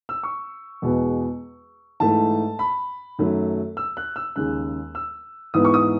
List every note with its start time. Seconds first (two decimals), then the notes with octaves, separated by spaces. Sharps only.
0.09 E6
0.23 C#6
0.82 E2 B2 G#3 B3
2.00 G#2 E3 A3 A5
2.59 B5
3.19 F#2 D#3 F#3 A3
3.77 E6
3.97 F#6
4.16 E6
4.36 D#2 C#3 G#3 F#6
4.95 E6
5.54 G#2 E3 B3 D#6
5.65 C#6
5.74 D#6